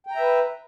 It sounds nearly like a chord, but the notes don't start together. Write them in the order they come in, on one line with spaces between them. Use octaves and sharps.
G5 A#5 E5 B4